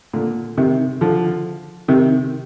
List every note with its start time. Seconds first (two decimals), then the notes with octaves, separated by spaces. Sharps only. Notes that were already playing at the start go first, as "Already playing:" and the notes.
0.14 A#2 D3
0.58 C3 D#3
1.01 D3 F3
1.88 C3 D#3